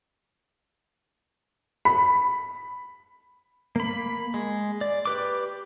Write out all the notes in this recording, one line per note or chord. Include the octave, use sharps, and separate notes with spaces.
B5
A#3 B5
G#3
D5
G4 B4 D6